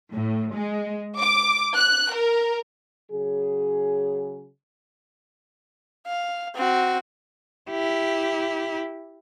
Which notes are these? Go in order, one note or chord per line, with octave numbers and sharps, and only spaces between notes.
A2
G#3
D6
F#6
A#4
C#3 F#3 G#4
F5
C4 F#4
E4 G4